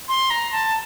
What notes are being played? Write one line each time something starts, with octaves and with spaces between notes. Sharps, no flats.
C6
A#5
A5